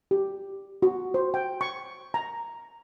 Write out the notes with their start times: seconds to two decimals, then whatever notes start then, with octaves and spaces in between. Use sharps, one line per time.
0.11 G4
0.82 F#4
1.14 C5
1.34 G5
1.61 C#6
2.14 A#5